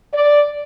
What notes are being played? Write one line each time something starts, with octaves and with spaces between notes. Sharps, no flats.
D5